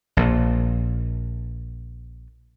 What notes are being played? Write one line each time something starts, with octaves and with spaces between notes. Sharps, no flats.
A#1 A#2